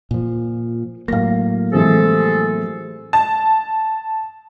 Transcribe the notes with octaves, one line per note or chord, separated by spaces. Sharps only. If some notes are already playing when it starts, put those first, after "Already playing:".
A#2 F3
A2 F#3 A#3 F5 A#6
C3 E3 F3 G#3 G#4 A4
A5